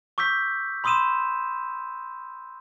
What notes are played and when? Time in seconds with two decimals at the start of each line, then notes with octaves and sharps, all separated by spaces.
0.18 C#6 D6 E6 G6 B6
0.84 B5 C6 D#6 E6 D#7 E7